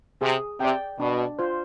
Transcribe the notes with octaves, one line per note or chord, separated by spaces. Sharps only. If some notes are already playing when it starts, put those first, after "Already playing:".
C3 G#4
C3 D5 G5
B2 D4
F4 C5